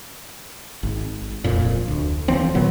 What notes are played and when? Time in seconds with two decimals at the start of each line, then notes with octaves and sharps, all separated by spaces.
0.83 G#1
1.44 D1 F2 A#2
1.88 D2
2.28 D2 E3 F3 C4
2.55 A#2 D#3 F#3 B3